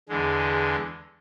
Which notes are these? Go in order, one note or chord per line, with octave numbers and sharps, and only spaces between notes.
E2 D3 G#3